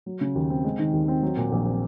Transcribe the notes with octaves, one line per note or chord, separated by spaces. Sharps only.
F#3
C#3
D#2
C4
G#3
D#3
D#2
C4
F#3
A#2
A#1
C4